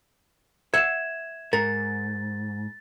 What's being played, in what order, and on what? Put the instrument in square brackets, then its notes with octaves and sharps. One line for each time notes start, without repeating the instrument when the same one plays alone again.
[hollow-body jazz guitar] E5 F#5 [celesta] G#6 E7
[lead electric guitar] G#2 [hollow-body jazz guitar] A#4 [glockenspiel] A6